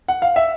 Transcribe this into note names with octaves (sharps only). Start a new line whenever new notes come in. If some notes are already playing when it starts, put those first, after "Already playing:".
F#5
F5
E5